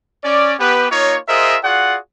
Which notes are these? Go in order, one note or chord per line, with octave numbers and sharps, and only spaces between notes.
C#4 D5
B3 G4 B4
A#3 D#4 F4 C#5
F4 G#4 A#4 C5 D#5 E5
F4 F#4 G#4 D5 F#5